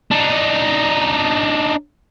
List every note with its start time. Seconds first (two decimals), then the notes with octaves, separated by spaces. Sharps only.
0.11 D4 D#4